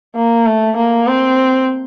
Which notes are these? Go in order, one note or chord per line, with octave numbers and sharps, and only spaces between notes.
A#3
A3
A#3
C4